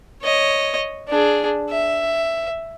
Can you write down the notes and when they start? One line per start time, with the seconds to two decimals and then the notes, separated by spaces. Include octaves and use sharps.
0.22 C#5 D#5
1.08 D4 G#4
1.70 E5